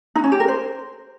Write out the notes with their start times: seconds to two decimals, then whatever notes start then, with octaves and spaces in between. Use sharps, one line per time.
0.16 D#4
0.24 C#4
0.32 G4
0.40 A#4
0.48 C5